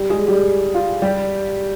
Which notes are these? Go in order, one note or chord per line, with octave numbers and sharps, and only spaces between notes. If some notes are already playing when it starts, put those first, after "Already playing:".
Already playing: G3 G4
G#3 G#4
G3 G4
F4
G3 G4